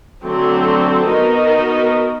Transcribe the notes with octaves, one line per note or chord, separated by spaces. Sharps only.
D3 F#3 A3 C4
B3 D#4 F#4 A#4